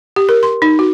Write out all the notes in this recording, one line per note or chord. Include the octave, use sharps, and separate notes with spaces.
G4
A#4
C6
D#4
F#4